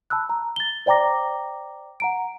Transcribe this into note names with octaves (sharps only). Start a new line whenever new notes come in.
A5 B5 E6 F#6
A#5
A6 G7
C5 D5 G5 A#5 D6 A#6
F#5 A#5 D7